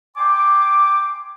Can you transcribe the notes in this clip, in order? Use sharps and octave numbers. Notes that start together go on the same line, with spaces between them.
G5 G#5 C6 D6